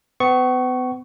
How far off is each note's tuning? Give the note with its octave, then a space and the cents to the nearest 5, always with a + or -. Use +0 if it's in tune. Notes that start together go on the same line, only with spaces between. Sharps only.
B3 +40 C#6 +0